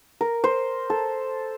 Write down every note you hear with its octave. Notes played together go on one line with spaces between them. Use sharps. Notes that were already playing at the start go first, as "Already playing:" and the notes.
A#4
C5
A4